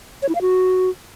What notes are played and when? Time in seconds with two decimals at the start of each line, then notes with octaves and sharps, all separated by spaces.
0.23 C#5
0.29 E4
0.35 F5
0.42 F#4